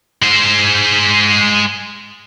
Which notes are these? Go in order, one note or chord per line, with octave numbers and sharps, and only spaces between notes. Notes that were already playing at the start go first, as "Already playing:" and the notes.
G#3 C5